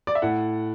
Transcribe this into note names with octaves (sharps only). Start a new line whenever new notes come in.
D5
E5
A2 F#5